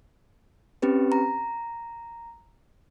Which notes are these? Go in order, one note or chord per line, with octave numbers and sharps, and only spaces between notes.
C4 C#4 G4 B4
A#5